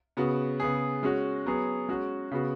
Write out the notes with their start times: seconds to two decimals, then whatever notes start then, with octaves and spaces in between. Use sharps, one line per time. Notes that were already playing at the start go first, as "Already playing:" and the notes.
0.17 C#3 B3 F#4
0.60 C#3 B3 G#4
1.03 G#3 C#4 F#4
1.46 F#3 B3 G#4
1.89 G#3 C#4 F#4
2.32 C#3 B3 F#4